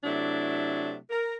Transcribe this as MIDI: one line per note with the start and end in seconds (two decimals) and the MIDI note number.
0.04 0.96 48
0.04 0.96 54
0.04 0.96 57
0.04 0.96 62
0.04 0.96 64
1.10 1.35 70